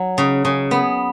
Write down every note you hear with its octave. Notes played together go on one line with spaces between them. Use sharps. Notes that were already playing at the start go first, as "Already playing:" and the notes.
Already playing: F#3
C#3
C#3
B3